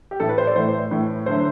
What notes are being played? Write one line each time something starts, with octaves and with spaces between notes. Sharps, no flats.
G4
A2 E3 A3 A4
B4
C5
D5
A2 E3 A3 C5
A2 E3 A3
D3 F#3 A3 C5